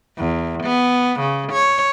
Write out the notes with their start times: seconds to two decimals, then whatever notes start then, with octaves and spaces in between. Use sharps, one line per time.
0.17 E2
0.63 B3
1.20 C#3
1.52 C#5